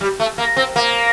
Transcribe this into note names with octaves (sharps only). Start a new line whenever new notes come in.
G3
A3
A#3
C4
A#3